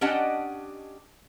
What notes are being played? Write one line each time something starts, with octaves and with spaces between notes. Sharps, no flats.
C#4 D4 G4 D#5 F#5 A5